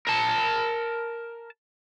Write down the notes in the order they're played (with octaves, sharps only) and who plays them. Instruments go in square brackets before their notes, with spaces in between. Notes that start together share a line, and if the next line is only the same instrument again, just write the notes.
[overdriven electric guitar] A#4 A5